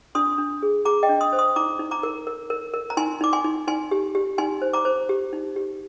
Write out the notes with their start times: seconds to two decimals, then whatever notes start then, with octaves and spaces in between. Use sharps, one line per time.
0.15 D4 C6 D#6
0.38 D4
0.63 G#4
0.85 G#4 A#5 D6
1.03 D#5 G5
1.09 D4
1.21 C6 D#6
1.33 C5
1.39 C6 D#6
1.56 D#4 A#5 D6
1.79 D#4
1.91 A#5 D6
2.03 A#4
2.27 A#4
2.50 A#4
2.74 A#4
2.90 A#5
2.97 D#4 G#5 C6
3.21 D#4 D6
3.33 G#5 C6
3.44 D#4
3.67 D#4 G#5 C6
3.91 G4
4.15 G4
4.38 D#4 G#5 C6
4.62 C5
4.73 A#5 D6
4.85 C5
5.09 G4
5.33 D#4
5.56 G4